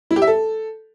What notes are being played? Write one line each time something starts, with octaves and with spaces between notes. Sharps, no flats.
E4
G4
E5
A4